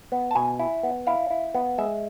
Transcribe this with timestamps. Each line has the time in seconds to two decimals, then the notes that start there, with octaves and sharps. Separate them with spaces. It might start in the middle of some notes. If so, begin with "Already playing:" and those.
0.12 B3
0.31 A5
0.35 B2 G#5
0.59 E4
0.83 B3
1.07 E4 F5
1.30 E4
1.54 B3
1.78 G#3 E5